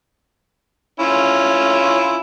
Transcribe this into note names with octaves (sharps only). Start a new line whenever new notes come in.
C#4 E4 F4